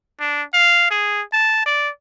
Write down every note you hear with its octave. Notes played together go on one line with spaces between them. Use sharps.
D4
F5
G#4
A5
D5